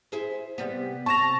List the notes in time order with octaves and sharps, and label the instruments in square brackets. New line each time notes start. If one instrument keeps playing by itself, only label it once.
[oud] E4 G#4 C5
C3 G3 B3
[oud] C3 [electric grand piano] A5 A#6 [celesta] C#6 E7 F7